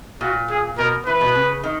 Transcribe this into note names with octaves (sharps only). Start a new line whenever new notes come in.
A#2 F#4
G#4
B2 A#4
E3 B4
B2
C#3
D#3